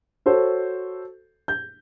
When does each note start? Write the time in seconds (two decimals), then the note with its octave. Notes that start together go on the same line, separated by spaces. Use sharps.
0.26 F#4 A4 C5 C#5
1.48 G6